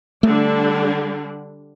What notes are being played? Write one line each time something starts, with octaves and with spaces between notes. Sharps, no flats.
D3 G3 A3 D4